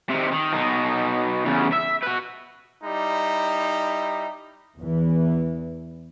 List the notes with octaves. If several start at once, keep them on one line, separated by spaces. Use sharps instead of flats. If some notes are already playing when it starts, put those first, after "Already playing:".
C3 D#3
D#3
B2 D#4
E2 C#3
E5
F#4 B4
G3 D#4 E4
E2 E3